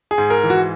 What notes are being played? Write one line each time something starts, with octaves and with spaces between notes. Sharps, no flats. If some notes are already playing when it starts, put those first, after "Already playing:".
G#4
G#2
A#4
E3
F#4